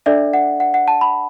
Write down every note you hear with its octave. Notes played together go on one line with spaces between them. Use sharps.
D4 A4 D5 E5
F#5
F#5
F#5
A5
B5